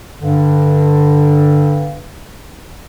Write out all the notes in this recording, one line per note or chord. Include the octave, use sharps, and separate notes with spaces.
G2 D3